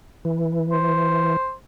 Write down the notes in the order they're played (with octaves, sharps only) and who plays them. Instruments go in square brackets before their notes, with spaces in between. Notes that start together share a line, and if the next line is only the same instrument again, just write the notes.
[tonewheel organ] E3
[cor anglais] C5